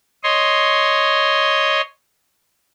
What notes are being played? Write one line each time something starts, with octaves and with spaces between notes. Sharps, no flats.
C#5 D#5 C6